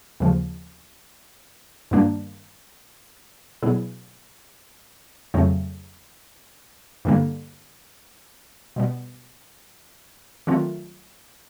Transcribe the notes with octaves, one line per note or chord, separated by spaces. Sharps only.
D#2 C#3 F3
G2 D#3 G3 A#3 D4
B2 F#3 B3 E4 G#4
F2 C#3 F#3 A3 C4
G2 D3 G3 A#3
B2 G3 B3
D#3 F#3 A3 C4 F4